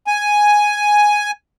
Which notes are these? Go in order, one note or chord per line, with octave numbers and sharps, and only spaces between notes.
G#5